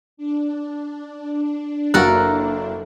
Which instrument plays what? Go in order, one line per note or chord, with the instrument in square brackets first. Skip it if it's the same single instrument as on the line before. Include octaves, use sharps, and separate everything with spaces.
[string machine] D4
[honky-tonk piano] F#1 F#3 A#3 [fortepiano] F#4 F#6 [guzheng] A4 A#4